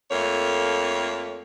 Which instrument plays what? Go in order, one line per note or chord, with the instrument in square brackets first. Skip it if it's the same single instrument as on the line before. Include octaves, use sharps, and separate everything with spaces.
[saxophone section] F2 A3 A#3 C#5